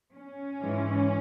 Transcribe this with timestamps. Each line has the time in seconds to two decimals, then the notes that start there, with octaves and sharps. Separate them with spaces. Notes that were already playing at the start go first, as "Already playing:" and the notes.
0.15 C#4
0.62 G#2 E3 G#3